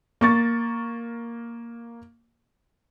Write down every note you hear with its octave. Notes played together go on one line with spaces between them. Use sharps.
A#3 C#6 A6